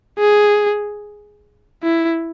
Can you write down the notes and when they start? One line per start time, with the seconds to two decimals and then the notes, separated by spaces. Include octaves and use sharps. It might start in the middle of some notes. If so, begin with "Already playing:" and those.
0.19 G#4
1.83 E4